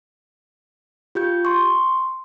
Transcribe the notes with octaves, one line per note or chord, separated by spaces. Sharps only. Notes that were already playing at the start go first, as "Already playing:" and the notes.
F4 G4 G6
C6 C#6